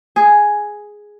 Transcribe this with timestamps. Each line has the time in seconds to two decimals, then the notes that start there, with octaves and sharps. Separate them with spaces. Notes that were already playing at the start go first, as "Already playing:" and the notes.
0.16 G#4